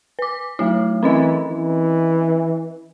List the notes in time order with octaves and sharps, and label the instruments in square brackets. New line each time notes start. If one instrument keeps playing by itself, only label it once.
[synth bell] B4 D6
F#3 A3 E4
[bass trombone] E3 [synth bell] C4 C#4 D#5
[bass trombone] E3